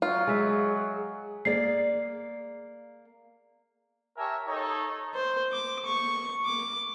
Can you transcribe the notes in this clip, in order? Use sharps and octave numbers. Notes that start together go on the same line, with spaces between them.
F#3 F4
G#3 G#4 E5
A#3 G#4 D5 C7
G4 A#4 C#5 E5 G#5 A5
D#4 A4 C#5
C5
D6
C#6
D6